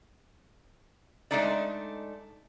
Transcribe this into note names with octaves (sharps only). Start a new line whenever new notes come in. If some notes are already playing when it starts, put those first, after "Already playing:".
G#3 A3 D4 D#4 D5